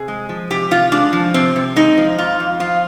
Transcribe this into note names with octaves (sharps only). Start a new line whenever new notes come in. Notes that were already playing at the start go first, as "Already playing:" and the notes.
Already playing: C3 G#4
G#3
F3
C3 G4
C3 F4
G#3 D4
F3
C3 C4
C3
G#3 D#4
F3
F2 F4
F2
F3 F4